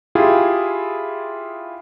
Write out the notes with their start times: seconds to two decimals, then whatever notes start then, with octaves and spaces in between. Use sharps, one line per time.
0.15 E4 F4 G4 G#4